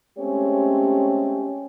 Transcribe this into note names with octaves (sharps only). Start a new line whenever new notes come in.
G#3 A3 C4 C#4 G4 C#5